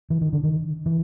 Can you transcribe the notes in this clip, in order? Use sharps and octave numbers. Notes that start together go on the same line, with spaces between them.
E3
D#3
D3
D#3
E3